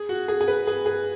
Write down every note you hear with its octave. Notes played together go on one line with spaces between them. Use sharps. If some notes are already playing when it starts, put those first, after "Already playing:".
Already playing: G#4
F#4
G#4
G#4
B4
G#4
G#4